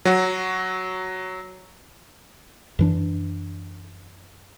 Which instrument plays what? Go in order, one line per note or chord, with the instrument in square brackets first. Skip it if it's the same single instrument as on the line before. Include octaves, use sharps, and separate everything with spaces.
[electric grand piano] F#3 F#4
[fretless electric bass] F#2 E3 D4